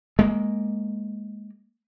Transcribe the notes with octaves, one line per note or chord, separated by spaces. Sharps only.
G#3 A#3